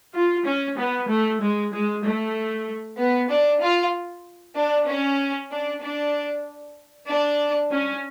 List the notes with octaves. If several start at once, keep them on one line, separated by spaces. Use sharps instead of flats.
F4
C#4
B3
A3
G#3
G#3
A3
B3
D4
F4
D4
C#4
D4
D4
D4
C#4